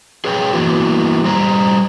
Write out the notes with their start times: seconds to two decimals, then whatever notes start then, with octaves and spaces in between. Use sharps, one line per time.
0.25 G#4 B4 C#5 G5
0.53 E3 A#3 B3 E4 F#4
1.24 G3 C5 A#5